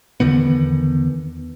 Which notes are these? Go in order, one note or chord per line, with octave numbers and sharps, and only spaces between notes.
E2 D3 D#3 B3